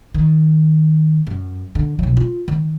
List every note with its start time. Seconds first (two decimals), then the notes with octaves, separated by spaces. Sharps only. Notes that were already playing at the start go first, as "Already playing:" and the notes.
0.14 D#3
1.27 F#2
1.75 D3
1.99 B1 F#3
2.17 F4
2.48 D#3